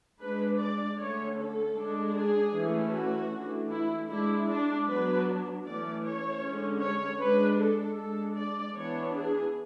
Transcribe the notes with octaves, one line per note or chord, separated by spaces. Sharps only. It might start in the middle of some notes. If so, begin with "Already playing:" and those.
G#3 D4 B4
D5
D3 A3 C#4 C#5
A4
G#3 D4
G#4
E3 A3 C#4
F#4
E3 A3 D4
E4
G#3 D4 E4
D4
F#3 B3 D4 B4
E3 A3 C#4 D5
C#5
D3 G#3 C#4
C#5
G#3 D4 B4
A4
G#3 D4 A4
D5
E3 B3 D4 C#5
G#4